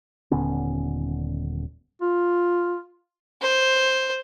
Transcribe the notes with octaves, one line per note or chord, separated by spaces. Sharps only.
D#1 D3 B3 C#4
F4
C5